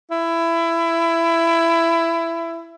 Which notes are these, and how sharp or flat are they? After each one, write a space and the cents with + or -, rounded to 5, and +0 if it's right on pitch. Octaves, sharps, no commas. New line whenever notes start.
E4 +20